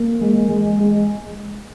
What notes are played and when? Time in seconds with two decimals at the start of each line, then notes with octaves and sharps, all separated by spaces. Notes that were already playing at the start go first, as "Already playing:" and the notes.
Already playing: A#3
0.21 G#3
0.49 G#3
0.79 G#3